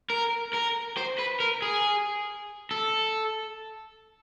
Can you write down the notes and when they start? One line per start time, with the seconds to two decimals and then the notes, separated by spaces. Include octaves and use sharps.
0.10 A#4
0.53 A#4
0.97 C5
1.18 B4
1.40 A#4
1.62 G#4
2.71 A4